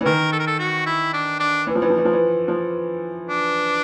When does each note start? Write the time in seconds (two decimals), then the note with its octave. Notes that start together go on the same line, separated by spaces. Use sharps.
0.01 E3
0.05 D#3 A#4
0.32 A4
0.39 A#4
0.47 A4
0.59 F#4
0.86 E4
1.13 D4
1.40 D4
1.67 E3
1.75 F3
1.82 E3
1.90 F3
1.98 E3
2.05 F3
2.13 E3
2.48 F3
3.29 D4